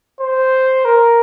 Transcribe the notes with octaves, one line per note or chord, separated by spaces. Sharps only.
C5
A#4